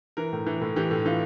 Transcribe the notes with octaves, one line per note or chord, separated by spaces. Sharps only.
E3 A#4
A2
E3
A2
E3 G4
A2
E3 F4